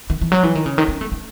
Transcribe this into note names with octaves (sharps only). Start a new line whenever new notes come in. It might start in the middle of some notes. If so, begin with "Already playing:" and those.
D#3
E3
F#3
E3
D#3
C#3
D#3
C#4
A3
A3